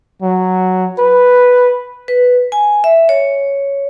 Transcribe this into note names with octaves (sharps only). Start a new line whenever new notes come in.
F#3
B4
B4
G#5
E5
C#5